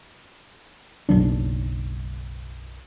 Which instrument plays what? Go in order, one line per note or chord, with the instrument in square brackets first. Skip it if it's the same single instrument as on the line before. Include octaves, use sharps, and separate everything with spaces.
[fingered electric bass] F#1 B1 F#3 D4